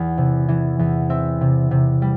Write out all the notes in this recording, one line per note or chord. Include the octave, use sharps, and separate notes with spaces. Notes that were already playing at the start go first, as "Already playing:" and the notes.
Already playing: E2 E3
C3
E3
E2
C4 E5
C3
C3
G3